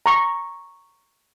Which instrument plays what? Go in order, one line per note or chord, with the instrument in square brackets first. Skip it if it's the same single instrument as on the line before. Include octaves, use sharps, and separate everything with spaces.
[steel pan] A#5 C#6